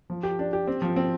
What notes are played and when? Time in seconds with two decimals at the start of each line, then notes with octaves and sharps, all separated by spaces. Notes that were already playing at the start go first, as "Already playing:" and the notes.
0.10 F3
0.23 G4
0.39 D4
0.53 G4
0.67 C4
0.82 F3
0.96 C4